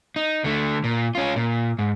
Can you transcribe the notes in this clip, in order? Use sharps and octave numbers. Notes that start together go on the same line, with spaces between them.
D#4
D3 A3
A#2
C#4 F4
A#2
G#2